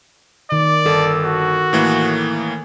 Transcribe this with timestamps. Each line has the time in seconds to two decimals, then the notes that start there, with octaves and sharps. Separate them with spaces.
0.52 D#3 D5
0.86 G1 A4
1.24 F#4
1.73 A2 E3 A#3